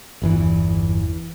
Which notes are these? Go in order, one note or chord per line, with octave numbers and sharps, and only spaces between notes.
G1 E2 E3